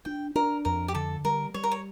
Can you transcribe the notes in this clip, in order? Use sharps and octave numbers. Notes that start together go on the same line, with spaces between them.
D4 G5
D4 A#4
F2 A#4
G4
D3 A4
G3 A#4
G3 C#5
A#4
C#5